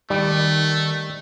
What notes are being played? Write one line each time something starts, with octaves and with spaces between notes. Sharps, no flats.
D#3 G3 A3